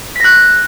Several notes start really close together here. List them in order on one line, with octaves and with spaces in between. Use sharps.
B6 A#6 F#6